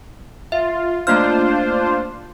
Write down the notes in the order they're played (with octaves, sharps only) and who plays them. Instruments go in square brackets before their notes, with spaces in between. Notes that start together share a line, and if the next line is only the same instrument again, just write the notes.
[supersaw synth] F4 [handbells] E5
[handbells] A3 A#3 F6 [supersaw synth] D4 F4 C5